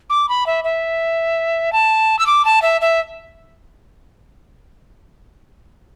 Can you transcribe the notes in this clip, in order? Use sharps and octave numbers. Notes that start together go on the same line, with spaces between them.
D6
B5
E5
E5
A5
E6
D6
A5
E5
E5